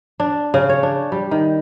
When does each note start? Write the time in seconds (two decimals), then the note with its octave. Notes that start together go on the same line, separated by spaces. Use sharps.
0.20 D4
0.54 C#3
0.69 C#5
0.83 D4
1.12 G3
1.31 D#3